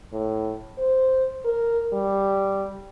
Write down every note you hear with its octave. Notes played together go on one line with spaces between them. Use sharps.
A2
C5
A#4
G3